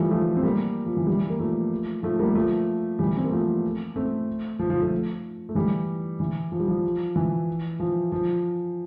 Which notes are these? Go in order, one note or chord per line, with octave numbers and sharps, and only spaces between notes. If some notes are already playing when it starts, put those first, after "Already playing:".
Already playing: E3 F3 G3 A3
F3 A3
C4
G3 A#3
F3
E3
E3 G3
A#3
F3 A3
F3 A3
G3 A#3
F3 A3
E3 G3
C4
A#3
F3 A3
A3 C4
F3
F3
F3 A3
A3
E3 G3
E3
F3
G3
F3
E3
F3
F3